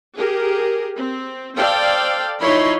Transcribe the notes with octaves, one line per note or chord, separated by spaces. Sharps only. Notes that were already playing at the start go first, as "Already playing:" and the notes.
G4 G#4 A#4
C4
A4 C5 D5 F5 G5
F3 D#4 E4 C#5 B5 C6